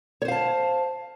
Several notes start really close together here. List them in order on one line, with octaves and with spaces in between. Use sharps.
C#5 C5 F5 A5